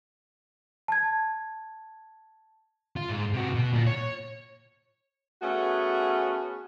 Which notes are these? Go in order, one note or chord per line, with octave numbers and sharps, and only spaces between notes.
A5 G#6
F4
G#2
C3 F#4
B2
A#2 A#3
C#5
A3 B3 C#4 F#4 G#4